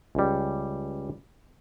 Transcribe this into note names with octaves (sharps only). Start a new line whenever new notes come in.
C#2 G3